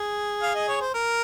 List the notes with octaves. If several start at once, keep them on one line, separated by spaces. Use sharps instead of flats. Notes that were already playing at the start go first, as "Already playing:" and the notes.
Already playing: G#4
F5
D#5
C#5
C5
A#4